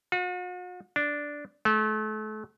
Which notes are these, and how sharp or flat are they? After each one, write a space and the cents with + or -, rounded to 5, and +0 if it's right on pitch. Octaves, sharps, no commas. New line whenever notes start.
F#4 -45
D4 -5
A3 -35